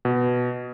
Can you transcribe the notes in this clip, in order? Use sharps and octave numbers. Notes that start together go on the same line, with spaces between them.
B2